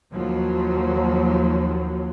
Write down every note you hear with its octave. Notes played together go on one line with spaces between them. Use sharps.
D#2 F3 F#3